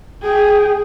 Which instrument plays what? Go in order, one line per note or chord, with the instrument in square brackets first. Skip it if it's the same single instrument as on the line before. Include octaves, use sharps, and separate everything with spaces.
[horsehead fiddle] G#4 G5